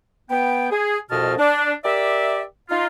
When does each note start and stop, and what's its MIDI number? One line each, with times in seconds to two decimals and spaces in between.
0.30 0.70 59
0.30 0.70 79
0.71 0.97 68
1.10 1.34 36
1.10 1.34 41
1.10 1.34 47
1.10 1.34 75
1.10 1.34 81
1.10 1.34 89
1.38 1.72 62
1.84 2.42 67
1.84 2.42 70
1.84 2.42 74
1.84 2.42 76
2.70 2.86 63
2.70 2.86 65